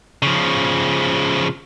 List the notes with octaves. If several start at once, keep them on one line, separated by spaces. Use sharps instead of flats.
C#3 F3